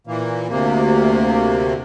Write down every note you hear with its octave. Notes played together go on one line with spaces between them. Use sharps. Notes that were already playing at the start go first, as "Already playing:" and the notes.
A#2 E3 A#3
D2 C3 A#3